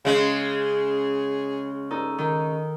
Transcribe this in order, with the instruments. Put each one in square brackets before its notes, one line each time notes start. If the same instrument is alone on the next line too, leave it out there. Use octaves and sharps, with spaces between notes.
[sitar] C#3 G#3 [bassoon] G#4
[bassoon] G2 [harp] D#4 A4
[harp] D#3 [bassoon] D#4